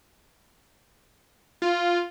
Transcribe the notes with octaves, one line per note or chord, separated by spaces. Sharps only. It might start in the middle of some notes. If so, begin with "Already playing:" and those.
F4